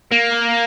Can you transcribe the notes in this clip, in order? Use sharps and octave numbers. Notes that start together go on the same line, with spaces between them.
A#3